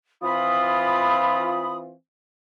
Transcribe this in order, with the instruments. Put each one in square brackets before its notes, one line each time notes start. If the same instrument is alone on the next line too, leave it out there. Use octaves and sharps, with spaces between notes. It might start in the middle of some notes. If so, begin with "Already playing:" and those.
[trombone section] E3 C4 F4 [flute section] B5 D#6